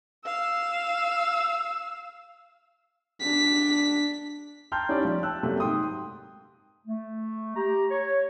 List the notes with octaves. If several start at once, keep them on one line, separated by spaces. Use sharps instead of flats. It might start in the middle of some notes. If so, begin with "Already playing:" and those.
F5 E6
D4 B6
G5 A5 A#5 C6 F6 G6
C#4 D#4 E4 G4 D5
F3
G5 A5 E6 F#6
F#2 C3 A3 A#3
G#2 G5 C6 D#6
A3
G4 A#5
C#5